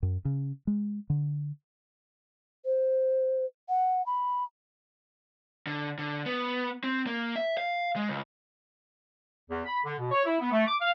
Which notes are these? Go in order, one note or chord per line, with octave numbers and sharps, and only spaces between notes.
F#2
C#3
G#3
D3
C5
F#5
B5
D3
D3
B3
C4
A#3
E5
F5
G#3
C#2
E2
B5
D3
B2
C#5
E4
B3
A3
D6
F5